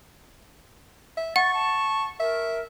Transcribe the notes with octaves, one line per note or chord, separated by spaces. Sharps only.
E5
F#5 C#6 A6
A5
A#4 E5